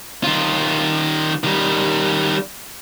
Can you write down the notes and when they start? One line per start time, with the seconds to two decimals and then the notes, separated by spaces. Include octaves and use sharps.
0.24 D#3 F4
1.44 D#3 G3